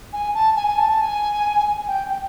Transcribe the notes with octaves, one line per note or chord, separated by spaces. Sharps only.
G#5
A5
G#5
G#5
A5
A5
G#5
G5
G5